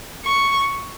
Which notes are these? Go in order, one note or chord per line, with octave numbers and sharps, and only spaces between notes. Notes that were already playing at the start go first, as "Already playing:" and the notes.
C#6